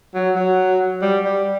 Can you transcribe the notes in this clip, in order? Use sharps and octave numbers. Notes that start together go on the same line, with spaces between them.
F#3
F#3
G3
G3